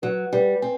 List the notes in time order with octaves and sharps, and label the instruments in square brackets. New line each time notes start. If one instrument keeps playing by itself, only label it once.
[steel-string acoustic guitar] F#3 [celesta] B4
[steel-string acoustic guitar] G3 [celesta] B4
[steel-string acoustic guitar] C4 [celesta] G#5